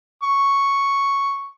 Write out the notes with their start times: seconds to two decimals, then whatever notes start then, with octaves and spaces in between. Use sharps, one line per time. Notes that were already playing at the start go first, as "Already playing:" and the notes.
0.23 C#6